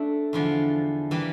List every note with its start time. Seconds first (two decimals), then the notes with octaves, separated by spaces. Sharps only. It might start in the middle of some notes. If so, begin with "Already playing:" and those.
Already playing: A3 D4 A4 E5
0.33 E2 D3 F3
1.11 E3 G3 A#3